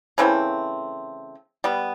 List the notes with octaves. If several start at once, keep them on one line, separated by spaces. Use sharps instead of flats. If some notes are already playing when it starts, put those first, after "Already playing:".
C#3 E3 A3 C4
G3 B3